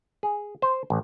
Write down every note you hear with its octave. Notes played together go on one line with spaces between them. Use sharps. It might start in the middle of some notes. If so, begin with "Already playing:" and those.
G#4
C5
A1